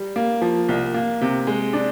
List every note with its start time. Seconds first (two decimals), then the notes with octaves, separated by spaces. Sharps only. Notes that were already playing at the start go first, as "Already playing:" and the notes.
Already playing: G3
0.16 A#3
0.42 F3
0.69 C2
0.94 A#3
1.21 C3
1.47 G#3
1.73 D4